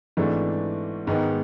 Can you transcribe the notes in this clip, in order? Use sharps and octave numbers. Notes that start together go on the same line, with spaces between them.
G#1 G#2 E3 A3 D4
G#2 D#3 G#3 B3 D#4